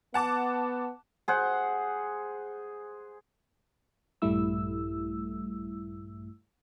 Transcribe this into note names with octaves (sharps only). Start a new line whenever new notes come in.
B3 F#5 A5 D6
G#4 C5 F#5
A#1 G2 G3 A3 E4 E6